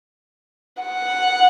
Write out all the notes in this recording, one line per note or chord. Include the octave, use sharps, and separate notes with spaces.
F#5